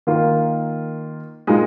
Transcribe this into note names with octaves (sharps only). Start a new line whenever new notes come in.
D#3 A#3 F4
A#2 G#3 D#4